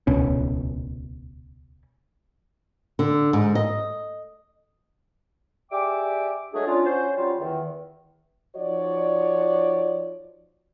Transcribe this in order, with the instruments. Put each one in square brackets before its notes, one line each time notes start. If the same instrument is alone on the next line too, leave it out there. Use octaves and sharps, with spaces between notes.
[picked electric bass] D#1 C#2 B2 C#4
[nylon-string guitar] D3
G#2
D#5
[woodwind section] G4 G#4 D5 E5 G5 D6
F#3 G#3 A3 D4 F#4 G#4
C#4 D4 F4
C#4 F#4 C5
F#3 G3 C#4 F4
E2 D#3
[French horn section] F3 D#4 F#4 C#5 D5